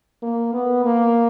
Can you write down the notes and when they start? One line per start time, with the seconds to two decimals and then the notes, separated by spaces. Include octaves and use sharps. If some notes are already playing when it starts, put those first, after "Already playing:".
0.23 A#3
0.54 B3
0.85 A#3